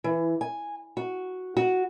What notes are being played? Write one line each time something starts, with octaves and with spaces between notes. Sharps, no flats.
E3
G#5
F#4
F#4